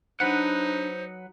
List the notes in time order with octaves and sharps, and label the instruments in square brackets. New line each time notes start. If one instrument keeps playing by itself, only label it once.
[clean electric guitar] F#3 B4 F#5 [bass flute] D4 [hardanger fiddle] D#4 [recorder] C5